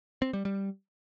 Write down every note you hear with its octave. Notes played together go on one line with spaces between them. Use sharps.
C4
G3
G3